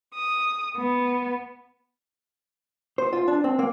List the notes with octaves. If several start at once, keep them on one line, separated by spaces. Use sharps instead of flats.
D#6
B3
C5
F4
D4
C4
A#3